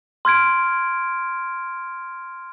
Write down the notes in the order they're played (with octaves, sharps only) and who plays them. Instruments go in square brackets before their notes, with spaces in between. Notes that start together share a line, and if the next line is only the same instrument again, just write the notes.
[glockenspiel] C6 F6 G#6 D7